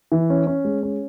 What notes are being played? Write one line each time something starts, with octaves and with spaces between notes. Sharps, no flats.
E3
C#4
C#4
G#3
C#4